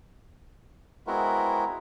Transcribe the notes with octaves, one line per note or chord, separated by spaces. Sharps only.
G#3 B3 C4 E4 F#4 A#4